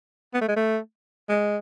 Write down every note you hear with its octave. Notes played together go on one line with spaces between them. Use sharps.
B3
A3
G#3
A3
G#3